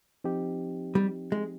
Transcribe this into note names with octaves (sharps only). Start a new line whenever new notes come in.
F3 C4 D#4 G4
G3
G#3